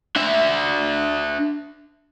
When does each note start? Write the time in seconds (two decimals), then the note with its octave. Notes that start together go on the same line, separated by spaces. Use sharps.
0.16 D4 E5